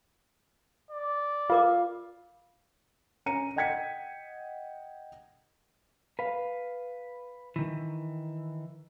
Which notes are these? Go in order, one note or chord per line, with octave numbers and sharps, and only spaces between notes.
D5
F4 A#4 F5 D6
C#4 A#5 C#7 D#7
D#5 F#5 G5 G#6 B6 C#7
B4 F5
D#3 E3